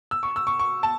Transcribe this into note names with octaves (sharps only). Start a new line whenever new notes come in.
E6
C#6
E6
C#6
C#6
A5